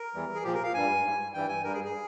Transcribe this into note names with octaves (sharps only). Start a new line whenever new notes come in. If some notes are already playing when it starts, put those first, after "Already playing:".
Already playing: A#4
E2 E3 G3
G#4
A#2 F3 G4
A#4
F5
G2 G3 G#5
G#2 G3
G2 E3 G3 G5
G#5
G2 G3 A#4
G#4
G#4